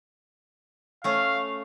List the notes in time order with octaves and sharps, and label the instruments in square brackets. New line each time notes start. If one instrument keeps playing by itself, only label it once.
[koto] A3 C#4 [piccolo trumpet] F5